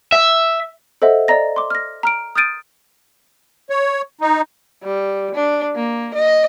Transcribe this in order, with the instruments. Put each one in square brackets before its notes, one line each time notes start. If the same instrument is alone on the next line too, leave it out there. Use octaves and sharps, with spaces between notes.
[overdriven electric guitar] E5
[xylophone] A4 C5 D#5 E5 F#5
D5 D#5 A#5 A#6
C6 D6
F6 A#6
A#5 F6 D7
D#6 F6 G6 A6 D7 D#7
[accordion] C#5
D#4
[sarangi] G3
D4
A#3
D#5